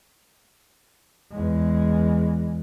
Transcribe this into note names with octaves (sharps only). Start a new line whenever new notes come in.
E2 G#3